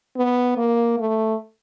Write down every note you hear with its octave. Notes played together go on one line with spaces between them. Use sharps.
B3
A#3
A3